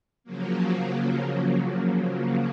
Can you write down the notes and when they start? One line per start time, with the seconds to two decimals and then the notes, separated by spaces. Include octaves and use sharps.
0.24 C#3 F3 F#3 A#3